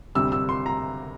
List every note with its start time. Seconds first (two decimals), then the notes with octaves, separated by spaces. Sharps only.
0.15 D2 C3 G3 C4 E6
0.32 E6
0.49 C6
0.66 A#5